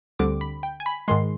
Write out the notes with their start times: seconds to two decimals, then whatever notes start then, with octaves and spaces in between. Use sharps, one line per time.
0.19 D2 D3 G3 C4 D6
0.41 B5
0.63 G5
0.80 G#5
0.86 B5
1.08 G#2 D#3 G#3 C6